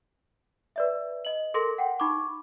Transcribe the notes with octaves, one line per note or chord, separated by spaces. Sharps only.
B4 D5 E5
D#5 F#7
A4 A#4 C6 A#6
F#5 G5
D#4 B5 C#6 D6